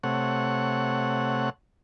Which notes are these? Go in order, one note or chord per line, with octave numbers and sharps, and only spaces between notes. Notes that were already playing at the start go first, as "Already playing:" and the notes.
C3 A3 C#5 F#5